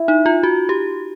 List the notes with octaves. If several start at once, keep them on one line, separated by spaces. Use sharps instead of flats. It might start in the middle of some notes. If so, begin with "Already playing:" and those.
Already playing: E4
D#4
F4
F#4
G4